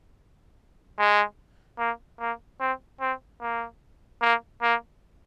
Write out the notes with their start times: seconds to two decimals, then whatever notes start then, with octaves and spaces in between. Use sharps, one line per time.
0.99 G#3
1.79 A#3
2.19 A#3
2.60 C4
3.01 C4
3.41 A#3
4.22 A#3
4.62 A#3